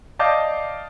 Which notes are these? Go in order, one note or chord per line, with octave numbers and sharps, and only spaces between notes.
D5 D#5 F5 A5 D6 G6